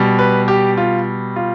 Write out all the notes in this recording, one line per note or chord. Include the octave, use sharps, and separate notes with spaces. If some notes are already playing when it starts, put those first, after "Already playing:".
Already playing: B2 G3
B4
G4
F4
F4